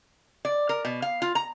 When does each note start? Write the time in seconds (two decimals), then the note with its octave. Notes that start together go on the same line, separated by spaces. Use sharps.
0.45 D5
0.69 A#4
0.85 B2
1.02 F5
1.22 F4
1.35 A#5